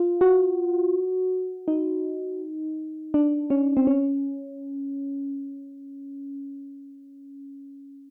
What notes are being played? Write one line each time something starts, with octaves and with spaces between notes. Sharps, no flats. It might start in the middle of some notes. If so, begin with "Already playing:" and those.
Already playing: F4
F#4
D#4
D4
C#4
C4
C#4